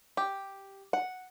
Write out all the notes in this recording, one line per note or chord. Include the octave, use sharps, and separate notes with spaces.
G4
F#5